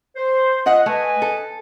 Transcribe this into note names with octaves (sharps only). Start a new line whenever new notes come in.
C5
F4 D#5 F#5
A3 B4 D#5 G#5
A4